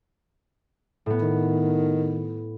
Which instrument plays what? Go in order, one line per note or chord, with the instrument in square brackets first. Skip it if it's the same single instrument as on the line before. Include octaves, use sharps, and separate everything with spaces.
[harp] A2 B3
[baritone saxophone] D#3